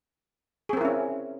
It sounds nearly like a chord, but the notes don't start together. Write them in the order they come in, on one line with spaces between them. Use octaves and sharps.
G#4 C4 A#4 E4 C#4